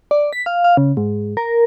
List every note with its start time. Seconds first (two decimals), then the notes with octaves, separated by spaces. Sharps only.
0.11 D5
0.33 B6
0.46 F5
0.64 F5
0.77 C#3
0.97 G#2
1.37 A#4